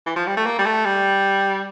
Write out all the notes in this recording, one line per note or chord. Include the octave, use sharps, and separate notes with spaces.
E3
F3
G3
A3
A#3
G3
A3
G3